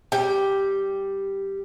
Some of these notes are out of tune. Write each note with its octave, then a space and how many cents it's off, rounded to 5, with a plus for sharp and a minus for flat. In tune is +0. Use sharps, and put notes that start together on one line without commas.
G3 +0 G5 +0